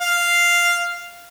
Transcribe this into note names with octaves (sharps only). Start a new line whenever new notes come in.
F5